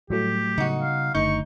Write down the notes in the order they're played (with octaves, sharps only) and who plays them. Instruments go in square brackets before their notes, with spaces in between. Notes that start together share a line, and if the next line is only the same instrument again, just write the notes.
[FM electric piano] A2 F#3 A3 [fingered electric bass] G3 [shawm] G4
[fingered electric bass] C#3 G3 B3 [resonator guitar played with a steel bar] D#4 F#4
[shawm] F5
[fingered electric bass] F#1 A3 [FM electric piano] D3 G6 [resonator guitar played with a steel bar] D#4 [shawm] C#6